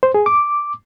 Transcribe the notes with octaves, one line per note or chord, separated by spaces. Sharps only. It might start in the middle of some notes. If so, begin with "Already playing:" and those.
C5
G#4
D6